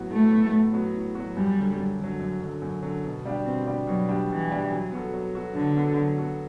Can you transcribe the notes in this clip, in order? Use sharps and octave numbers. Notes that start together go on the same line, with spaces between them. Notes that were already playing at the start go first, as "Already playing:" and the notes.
Already playing: A2 F#3 B3 F#4
A2 A3
F#3 B3 F#4
A2
F#3 B3 F#4
A2
F#3 B3 F#4
F#2 G3
D3 F#3
F#2
D3 F#3
F#2
D3 F#3
F#2
D3 F#3
B2
G3 D4 G4
B2 C4
G3 D4 G4
B2 F#3
G3 D4 G4
B2 E3
G3 D4 G4
F#3
B3 F#4 A4
F#3
B3 F#4 A4
D3 F#3
B3 F#4 A4
F#3
B3 F#4 A4